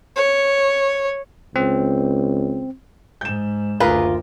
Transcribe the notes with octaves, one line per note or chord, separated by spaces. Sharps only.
C#5
C#2 C4
G#2 G6 E7
F#1 D2 F4 G#4 A#4 B4 A#5